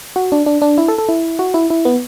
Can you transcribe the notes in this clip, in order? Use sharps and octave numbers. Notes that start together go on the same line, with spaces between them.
F#4
D4
D4
D4
E4
A4
A4
E4
F#4
E4
E4
B3